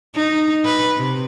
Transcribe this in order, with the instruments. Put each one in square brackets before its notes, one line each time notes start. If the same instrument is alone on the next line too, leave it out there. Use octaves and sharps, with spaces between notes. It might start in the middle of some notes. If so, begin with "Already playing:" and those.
[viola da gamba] D#4
B4
C3